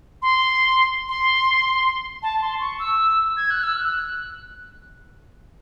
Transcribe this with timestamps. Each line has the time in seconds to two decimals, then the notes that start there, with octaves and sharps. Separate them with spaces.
0.22 C6
1.08 C6
2.23 A5
2.42 C6
2.60 C#6
2.79 E6
3.37 G#6
3.51 F#6
3.64 E6
3.77 F#6